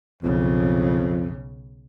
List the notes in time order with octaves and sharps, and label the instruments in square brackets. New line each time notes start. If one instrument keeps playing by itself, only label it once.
[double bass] B1 C#3 [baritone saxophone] F2